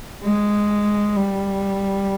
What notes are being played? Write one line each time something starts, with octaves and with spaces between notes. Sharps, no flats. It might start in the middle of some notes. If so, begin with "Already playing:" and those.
G#3
G3